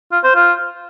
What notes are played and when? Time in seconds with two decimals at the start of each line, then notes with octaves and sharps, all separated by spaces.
0.12 F4
0.24 C5
0.35 F4